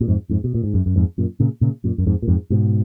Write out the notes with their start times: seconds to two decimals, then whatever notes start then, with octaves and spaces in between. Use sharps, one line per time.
0.01 A#2
0.08 F2 G#2
0.30 F2 G#2
0.44 B2
0.55 A#2
0.64 G#2
0.74 F#2
0.86 F#2
0.96 F2 G#2
1.18 F#2 A#2
1.40 A#2 C#3
1.61 A#2 C#3
1.84 F#2 A#2
1.98 F#2
2.07 F2 G#2
2.22 A#2
2.28 F2 G#2
2.50 G#2 B2